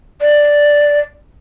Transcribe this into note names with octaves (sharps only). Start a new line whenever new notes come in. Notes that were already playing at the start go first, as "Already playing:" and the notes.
D5